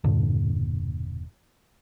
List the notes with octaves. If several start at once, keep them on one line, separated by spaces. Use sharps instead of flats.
E1 G2 A#2 D3